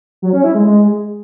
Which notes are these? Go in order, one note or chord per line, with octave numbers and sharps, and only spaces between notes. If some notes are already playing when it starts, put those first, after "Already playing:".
F#3
C#4
E4
G#3
G#3